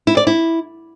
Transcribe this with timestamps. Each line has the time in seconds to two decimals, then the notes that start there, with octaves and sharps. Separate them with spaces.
0.07 E4
0.17 D5
0.27 E4